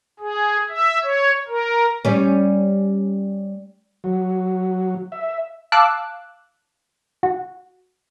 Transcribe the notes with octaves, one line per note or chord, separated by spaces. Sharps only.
G#4
E5
C#5
A#4
G3 C#4
F#3
E5
F5 A5 D6 E6 F#6
F#4